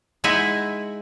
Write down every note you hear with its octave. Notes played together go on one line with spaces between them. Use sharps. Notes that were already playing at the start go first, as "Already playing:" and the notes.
G#3 D#4 E4 E5 F#5 G#5